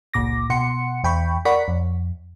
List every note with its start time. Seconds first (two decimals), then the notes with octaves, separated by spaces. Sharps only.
0.14 G1 C#2 A#2 D6 A#6
0.50 B2 F#5 C6 C#7
1.04 E2 G5 B5 C#6
1.45 A#4 D5 F#5 B5 C#6 B6
1.68 F2